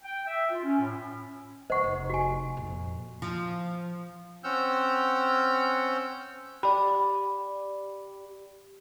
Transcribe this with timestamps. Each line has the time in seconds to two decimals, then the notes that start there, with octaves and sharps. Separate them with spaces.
0.03 G5
0.26 E5
0.51 F4
0.64 C#4
0.80 A2
1.70 C#2 C5 D#5 F#5 C#6
1.84 F1
2.10 F#4 G4 G#5
2.57 F2 A#2
3.22 F3
4.44 C4 C#4 F#5 E6 F6 G6
6.63 G4 D5 B5